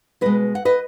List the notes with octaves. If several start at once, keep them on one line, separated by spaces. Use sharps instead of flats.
B2 G#3 B4 D#5
F#5
B4 D#5